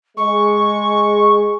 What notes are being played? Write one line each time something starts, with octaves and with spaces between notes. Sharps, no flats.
G#3 C#6